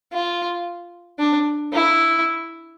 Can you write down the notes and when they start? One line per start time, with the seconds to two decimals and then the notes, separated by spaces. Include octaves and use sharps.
0.13 F4
1.19 D4
1.73 E4